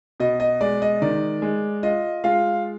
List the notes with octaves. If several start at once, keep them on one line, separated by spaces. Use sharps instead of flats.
B2 D#5
D#5
G#3 D5
D#5
D#3 D5
G#3
F4 D#5
G#3 F4 F5